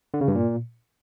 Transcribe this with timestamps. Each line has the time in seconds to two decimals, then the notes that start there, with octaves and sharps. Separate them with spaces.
0.14 D3
0.21 C#3
0.28 G2
0.35 A#2